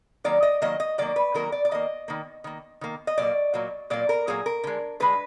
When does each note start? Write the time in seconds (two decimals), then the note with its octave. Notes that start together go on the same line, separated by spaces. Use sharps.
0.24 D#3 F#3 A#3 D5
0.43 D#5
0.62 D#3 F#3 A#3 D#5
0.80 D#5
0.98 D#3 F#3 A#3 D5
1.16 B4
1.34 D#3 F#3 A#3 A#4
1.52 D5
1.65 D5
1.71 D#3 A#3 D#5
2.08 D#3 A#3
2.44 D#3 A#3
2.81 D#3 A#3
3.07 D#5
3.18 A#2 F#3 A#3 D5
3.54 A#2 F#3 A#3
3.90 A#2 F#3 A#3 D5
4.09 A#4
4.27 A#2 F#3 A#3 G#4
4.46 A#4
4.64 D3 G#3
5.00 D3 G#3 B4